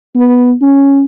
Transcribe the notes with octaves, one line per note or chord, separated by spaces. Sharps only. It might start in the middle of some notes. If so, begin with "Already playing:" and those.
B3
C#4